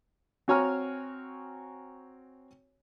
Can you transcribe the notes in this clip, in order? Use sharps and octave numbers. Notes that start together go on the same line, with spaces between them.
C4 F#4 C#5 G#5 A#5 F6